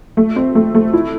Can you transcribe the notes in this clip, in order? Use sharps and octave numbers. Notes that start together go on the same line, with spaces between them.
A3
C4
A3
A3
E4